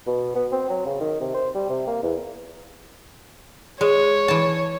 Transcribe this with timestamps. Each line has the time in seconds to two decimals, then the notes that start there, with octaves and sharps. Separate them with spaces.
0.07 B2
0.35 B3
0.52 C4
0.69 F#3
0.85 C#3
1.01 D#3
1.20 C3
1.34 C5
1.55 G3
1.70 C3
1.87 A#3
2.03 E2
3.81 G#3 C#5
4.28 E3 A5